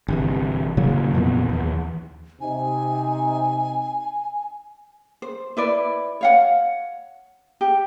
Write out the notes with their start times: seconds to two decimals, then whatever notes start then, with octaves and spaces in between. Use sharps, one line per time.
0.08 G1 C3 E3
0.77 A2 C#3 F#3 A#3
1.13 F2 A#2 E3 B3
1.49 D#2 E3
2.41 C3 D#4 G#5
5.22 C5
5.57 E4 B4 D5
6.21 C#5 F5 F#5
7.61 G4